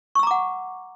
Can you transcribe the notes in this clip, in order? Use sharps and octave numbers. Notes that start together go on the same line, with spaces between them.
F#5 A#5 C#6 D6 E6